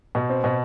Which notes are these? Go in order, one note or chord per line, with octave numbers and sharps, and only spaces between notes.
B2
C4
B2